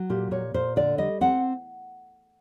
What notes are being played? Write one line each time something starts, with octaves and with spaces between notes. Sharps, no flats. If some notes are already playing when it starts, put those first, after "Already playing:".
Already playing: F#3
A#2 G4
A#2 C#5
A#2 C5
D3 D5
G3 D#5
C4 F#5